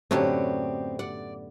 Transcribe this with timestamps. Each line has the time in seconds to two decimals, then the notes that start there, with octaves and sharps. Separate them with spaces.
0.11 F#2 A2 D3 F#3 A3 B3 C4 G4
0.99 D5 F#5